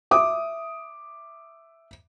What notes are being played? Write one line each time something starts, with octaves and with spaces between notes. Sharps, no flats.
E5 D6 D#6